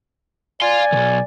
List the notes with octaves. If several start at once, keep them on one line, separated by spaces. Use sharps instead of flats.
D5 F5 G#5 C6
B1 D#3